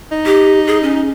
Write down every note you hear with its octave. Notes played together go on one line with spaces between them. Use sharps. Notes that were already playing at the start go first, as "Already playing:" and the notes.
D#4
G4
G#4
C#4